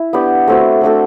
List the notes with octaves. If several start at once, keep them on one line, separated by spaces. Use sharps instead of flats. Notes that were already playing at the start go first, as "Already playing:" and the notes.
Already playing: E4
B3 D4 G4
A3 C4 F#4
A3 D4 F#4 A4